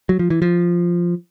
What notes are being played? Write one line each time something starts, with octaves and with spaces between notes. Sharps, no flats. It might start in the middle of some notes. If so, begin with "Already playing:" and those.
F#3
F3
E3
F3